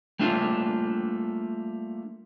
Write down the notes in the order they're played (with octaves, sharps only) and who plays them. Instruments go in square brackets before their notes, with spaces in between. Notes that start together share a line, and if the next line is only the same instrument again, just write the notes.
[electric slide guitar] G3 A3 A#3 D4 F4